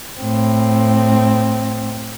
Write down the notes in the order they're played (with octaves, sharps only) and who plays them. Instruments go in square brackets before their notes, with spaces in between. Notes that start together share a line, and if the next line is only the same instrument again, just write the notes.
[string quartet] A2 C4